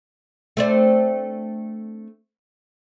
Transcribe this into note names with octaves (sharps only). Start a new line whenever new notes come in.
A3 C4 D4